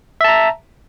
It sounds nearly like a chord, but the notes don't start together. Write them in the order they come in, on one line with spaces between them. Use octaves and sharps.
E5 A5 A#5